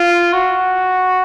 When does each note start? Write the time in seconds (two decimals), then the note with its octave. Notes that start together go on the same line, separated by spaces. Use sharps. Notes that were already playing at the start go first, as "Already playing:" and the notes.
Already playing: F4
0.33 F#4